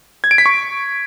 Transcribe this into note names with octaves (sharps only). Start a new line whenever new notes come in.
G#6
D7
B6
C#6